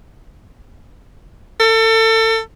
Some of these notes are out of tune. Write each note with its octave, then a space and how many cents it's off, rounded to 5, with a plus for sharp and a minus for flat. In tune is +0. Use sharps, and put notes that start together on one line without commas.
A4 +30